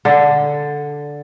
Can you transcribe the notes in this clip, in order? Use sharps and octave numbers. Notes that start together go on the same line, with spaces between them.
D3